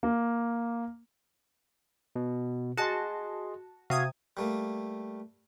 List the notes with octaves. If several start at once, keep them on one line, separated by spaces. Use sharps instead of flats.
A#3
B2
F#4 G#4 D#5 A5 C6
C3 F#4 E5 F5 D#6 G#6
G3 A3 A#3